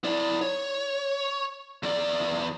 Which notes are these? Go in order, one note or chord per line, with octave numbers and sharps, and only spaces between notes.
E4 D5
C#5
E2 D5